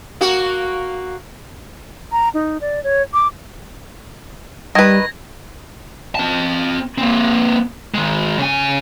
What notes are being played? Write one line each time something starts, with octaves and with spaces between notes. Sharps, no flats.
A#3 F#4
A#5
D#4
D5
C#5
D6
D#3 G3 B4 G#6 A#6
C4 A5
A#3 C4
D#3 G#3
C#3 G#5